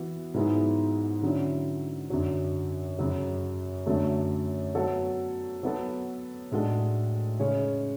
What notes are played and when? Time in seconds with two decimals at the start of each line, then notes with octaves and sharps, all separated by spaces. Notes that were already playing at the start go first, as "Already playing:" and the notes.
Already playing: E3 B3 F#4
0.34 G#2 F#3 B3 E4 G#4
1.22 D3 F#3 C#4 E4
2.10 F#2 D3 F#3
2.99 F#2 C#3 F#3
3.86 F#2 D3 F#3 A3
4.75 F#3 B3 F#4 A4 C#5
5.63 F#3 B3 F#4 A4
6.51 A2 G#3 D4 F#4 A4
7.39 C#3 G#3 C#4 G#4 C#5